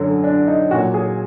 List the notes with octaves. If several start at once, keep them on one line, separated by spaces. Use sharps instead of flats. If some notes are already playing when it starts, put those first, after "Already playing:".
Already playing: F#2 D3 F#3
D4
D#4
A#2 F#3 F#4
G#4